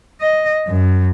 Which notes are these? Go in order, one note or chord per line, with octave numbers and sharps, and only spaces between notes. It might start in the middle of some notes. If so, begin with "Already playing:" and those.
D#5
F#2